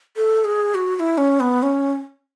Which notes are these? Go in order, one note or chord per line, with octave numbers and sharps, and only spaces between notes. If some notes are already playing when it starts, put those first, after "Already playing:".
A4
G#4
F#4
F#4
E4
C#4
B3
C#4